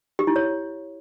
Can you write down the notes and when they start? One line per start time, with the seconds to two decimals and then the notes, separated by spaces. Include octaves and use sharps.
0.19 G4
0.27 E4
0.36 C#5